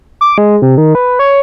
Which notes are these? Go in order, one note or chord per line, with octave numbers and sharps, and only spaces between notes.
D6
G#3
C3
D#3
B4
C#5